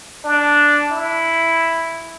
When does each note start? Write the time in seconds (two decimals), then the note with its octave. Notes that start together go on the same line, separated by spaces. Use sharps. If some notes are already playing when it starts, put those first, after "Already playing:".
0.25 D4
0.92 E4